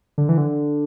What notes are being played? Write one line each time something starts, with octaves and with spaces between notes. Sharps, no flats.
D3
E3
D3